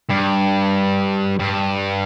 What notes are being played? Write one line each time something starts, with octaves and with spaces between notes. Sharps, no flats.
G2
G2